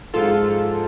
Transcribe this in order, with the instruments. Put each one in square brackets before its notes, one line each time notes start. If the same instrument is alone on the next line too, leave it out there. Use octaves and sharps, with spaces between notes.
[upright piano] G#2 F3 G#3 [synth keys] F4 A4